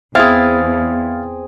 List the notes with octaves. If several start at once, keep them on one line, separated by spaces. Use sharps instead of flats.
E2 C4 E4 G#4 F5 F6 A6